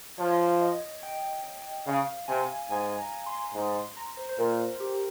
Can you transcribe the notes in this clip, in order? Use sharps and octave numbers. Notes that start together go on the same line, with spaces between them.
F3 C#5
D#5
G5
C#3 F5
C3 G#5
G#2 G#5
A#5
C6
G#2 C6
C6
A#5
C5
C5
A#2 A#4
G4